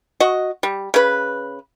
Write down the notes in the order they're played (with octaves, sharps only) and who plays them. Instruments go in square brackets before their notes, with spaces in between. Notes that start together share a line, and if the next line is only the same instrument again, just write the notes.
[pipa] F#4 D#5
G3
C#3 B4